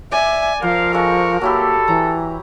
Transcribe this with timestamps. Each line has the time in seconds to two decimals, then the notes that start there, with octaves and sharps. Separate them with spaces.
0.12 D5 E5 G#5
0.62 F3 A#4 C5 F5
0.93 G#3 A4 C#6
1.41 F#3 A#3 E4 G4 A4
1.88 E3 A#5